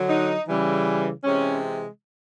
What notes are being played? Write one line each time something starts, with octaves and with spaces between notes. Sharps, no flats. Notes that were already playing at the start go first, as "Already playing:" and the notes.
Already playing: D3 F#3
D#4
C#3 E3 G3
C3 E3 G#3 C#4